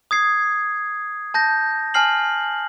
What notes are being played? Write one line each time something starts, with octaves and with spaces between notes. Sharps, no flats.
D#6 G#6 C7
A5 G6 A#6
G#5 A5 F6 C7 F#7